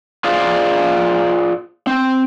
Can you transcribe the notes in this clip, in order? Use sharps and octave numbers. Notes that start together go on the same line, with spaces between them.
F4 G#4 C5 D5 F5
C4